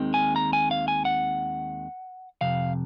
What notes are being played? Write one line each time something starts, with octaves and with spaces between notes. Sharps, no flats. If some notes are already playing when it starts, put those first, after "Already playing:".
Already playing: D#2 D#3 G#3 C4
G#5
A#5
G#5
F5
G#5
F#5
F2 C3 F5